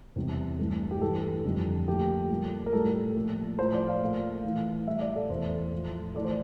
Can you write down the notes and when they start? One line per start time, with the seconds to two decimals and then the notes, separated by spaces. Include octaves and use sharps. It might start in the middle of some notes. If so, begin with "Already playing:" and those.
0.16 E2 C3 G3
0.58 G2 E3 A3
0.91 G4
1.01 G2 E3 A3 A4
1.45 F2 D3 G3
1.87 A#2 F3 A3 G4
2.30 A#2 G3
2.66 A#4
2.73 A2 G3 A4
3.15 A#2 F3 A3
3.59 A2 F3 A3 C5
3.73 D5
3.87 F5
4.02 A#2 A3
4.43 A2 E3 A3
4.87 A2 G3 E5
5.01 D5
5.16 A4
5.30 E2 E3 A3 C5
5.73 A2 F3 A3
6.15 E3 A3 D5
6.24 C5